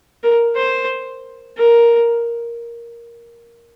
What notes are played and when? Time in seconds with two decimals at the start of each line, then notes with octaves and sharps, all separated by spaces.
0.23 A#4
0.56 C5
1.58 A#4